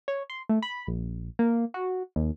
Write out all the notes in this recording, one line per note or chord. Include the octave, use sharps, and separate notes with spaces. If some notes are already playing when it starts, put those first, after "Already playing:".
C#5
C6
A3
B5
A#1
A#3
F#4
D#2